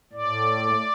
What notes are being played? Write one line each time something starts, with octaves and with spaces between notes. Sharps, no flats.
A2 D5